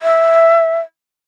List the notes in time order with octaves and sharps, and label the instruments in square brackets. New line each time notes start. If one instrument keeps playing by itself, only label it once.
[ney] E5